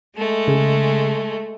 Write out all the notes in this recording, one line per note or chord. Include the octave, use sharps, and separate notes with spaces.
G#3 A3
C#3 G#4